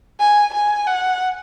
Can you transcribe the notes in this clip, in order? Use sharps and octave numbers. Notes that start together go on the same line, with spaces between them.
G#5
G#5
F#5